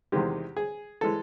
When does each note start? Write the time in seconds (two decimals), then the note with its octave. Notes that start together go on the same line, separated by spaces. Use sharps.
0.12 E2 C3 D#3 G#3 G4
0.56 G#4
1.01 E3 G#3 A4